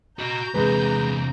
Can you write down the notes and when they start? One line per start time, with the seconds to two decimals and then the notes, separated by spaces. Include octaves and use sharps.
0.19 F#4 D#5 A#5 G6
0.54 E2 C3 G#3 B4